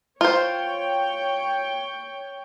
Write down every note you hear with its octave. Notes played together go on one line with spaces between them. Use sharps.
F4 C5 C#5 G5